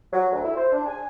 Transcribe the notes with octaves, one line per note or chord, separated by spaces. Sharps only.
F#3
D2
E4
C5
D4
G#5